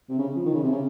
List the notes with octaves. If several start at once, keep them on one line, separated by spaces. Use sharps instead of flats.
C3
C#3
F3
D#3
C#3
C3
C#3